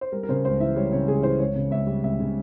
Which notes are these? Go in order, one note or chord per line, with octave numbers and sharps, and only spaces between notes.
C5
G3 A#4
A#4
C#3 C5
C#2 C5
E3 E5
G3 C#5
C#3 C#5
C#2 G#4
E3 C5
C#2 C#5
C#3
C#2 E5
G3
C#2 E5
C#3